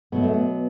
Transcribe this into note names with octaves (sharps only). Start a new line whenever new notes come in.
B2 F#3 A3 B3
A3
B3